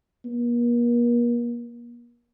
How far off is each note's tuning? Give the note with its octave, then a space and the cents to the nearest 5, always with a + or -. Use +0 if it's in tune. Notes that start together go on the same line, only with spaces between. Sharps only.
A#3 +40